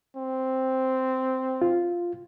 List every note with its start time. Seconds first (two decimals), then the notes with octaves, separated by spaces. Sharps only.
0.16 C4
1.62 F4